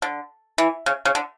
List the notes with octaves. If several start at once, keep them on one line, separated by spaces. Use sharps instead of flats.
D3
E3
C#3
C#3
D3